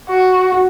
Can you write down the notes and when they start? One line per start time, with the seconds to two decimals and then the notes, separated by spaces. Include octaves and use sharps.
0.09 F#4
0.52 F#4